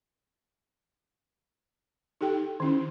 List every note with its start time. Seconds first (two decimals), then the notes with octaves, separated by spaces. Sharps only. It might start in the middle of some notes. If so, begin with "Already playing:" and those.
2.21 D#4 G4 A4 G5
2.60 D#3 C#4 E4